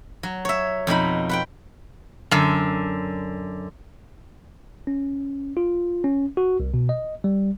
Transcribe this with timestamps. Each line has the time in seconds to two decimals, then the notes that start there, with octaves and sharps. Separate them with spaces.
0.23 F#3
0.45 C#5 E5
0.87 F2 B2 D#4 B5
1.29 B4 F#5 G5
2.31 F#2 D3
4.87 C#4
5.57 F4
6.04 C#4
6.37 F#4
6.60 C2
6.74 B2
6.89 D#5
7.24 G3